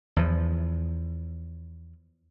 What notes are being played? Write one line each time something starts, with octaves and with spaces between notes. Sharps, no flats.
E2 F3